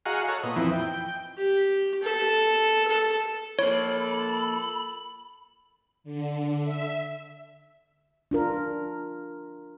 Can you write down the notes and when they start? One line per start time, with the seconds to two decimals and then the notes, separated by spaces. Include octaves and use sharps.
0.06 F#4 G#4 D#5 F5 F#5 A#5
0.28 A4 C#5 A#5
0.43 A#2 B3 D#5
0.56 F2 E3 F3 C4 D#4 E4
0.73 G5
1.37 G4
2.03 A4
2.88 A4
3.59 F3 A#3 A4 C#5 B5
6.04 D3
6.63 E5
8.31 D4 F4 A#4